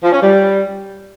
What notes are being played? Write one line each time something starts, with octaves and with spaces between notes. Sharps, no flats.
F3
C#4
G3